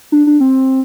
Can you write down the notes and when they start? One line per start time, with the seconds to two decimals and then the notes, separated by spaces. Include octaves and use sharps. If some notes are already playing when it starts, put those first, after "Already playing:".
0.12 D4
0.27 D4
0.40 C4